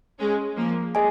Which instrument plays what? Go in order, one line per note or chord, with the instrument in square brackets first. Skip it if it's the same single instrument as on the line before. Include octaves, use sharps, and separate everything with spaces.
[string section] G#3 C#4
F3 A#3
[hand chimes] G#4 D#5 G#5